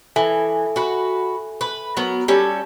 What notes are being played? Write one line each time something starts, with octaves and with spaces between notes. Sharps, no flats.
E3 A4 E5 G#5
F#4 B4
B4
F#3 B3 A#4
G3 C#4 A4